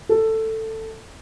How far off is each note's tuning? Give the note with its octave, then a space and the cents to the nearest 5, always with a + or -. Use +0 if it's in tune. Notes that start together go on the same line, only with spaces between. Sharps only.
A4 +10